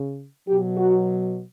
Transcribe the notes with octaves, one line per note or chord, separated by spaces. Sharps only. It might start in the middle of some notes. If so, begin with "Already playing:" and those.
Already playing: C#3
B2 F#3 G4
F#4